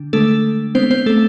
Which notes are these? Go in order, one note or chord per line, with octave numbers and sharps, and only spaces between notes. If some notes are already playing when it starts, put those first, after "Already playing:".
Already playing: D3 D4
D3 G#3 A3 D4 A4
G#3 B3 C4 D4 C5
C4 C5
A3 A4